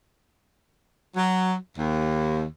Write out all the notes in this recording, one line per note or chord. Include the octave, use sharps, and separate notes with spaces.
F#3
D#2